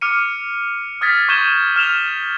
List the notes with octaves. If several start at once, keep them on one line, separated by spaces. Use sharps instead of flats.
D6 F6 C#7 D#7
D#6 F6 G#6 A6 B6
C#6 G6 G#6 D#7 E7 G7
F6 E7 F7 G7